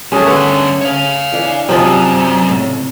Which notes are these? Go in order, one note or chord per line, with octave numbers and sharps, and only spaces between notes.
D#2 A3 C#4 G#4
G2 D3 B4 F#5
C#5 F5
E3 D4 G#5
F#2 C3 F3 F#4 C5 D5 D#5
A2 C#3